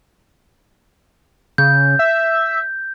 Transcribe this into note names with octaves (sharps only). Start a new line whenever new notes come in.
C#3 G6
E5